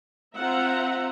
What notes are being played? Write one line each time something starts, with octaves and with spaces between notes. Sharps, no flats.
C4 F4 C5 E5 F#5 A#5